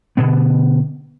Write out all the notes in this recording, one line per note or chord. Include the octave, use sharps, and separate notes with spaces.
B2 D3 B3